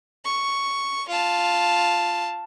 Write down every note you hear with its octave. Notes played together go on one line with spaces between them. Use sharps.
C#6
F4 A5